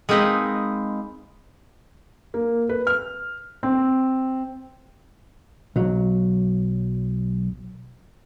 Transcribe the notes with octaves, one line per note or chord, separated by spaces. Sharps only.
G#3 A#3 C4 D#4 B4 D#5
A#3
B4
F6
C4
B1 F#3